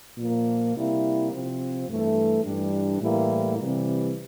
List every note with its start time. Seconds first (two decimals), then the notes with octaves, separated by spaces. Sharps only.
0.18 A#2 F3 A#3
0.75 C3 G3 A#3 E4
1.31 C3 F3 C4
1.88 G2 E3 A3
2.44 G2 E3 G3 D4
3.01 A2 E3 G3 A#3 E4
3.57 C3 E3 G3